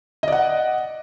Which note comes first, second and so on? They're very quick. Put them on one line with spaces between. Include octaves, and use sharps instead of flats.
D#5 D5 F#5